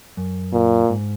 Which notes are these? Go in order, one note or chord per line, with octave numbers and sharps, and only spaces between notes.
F#2
A#2
G#2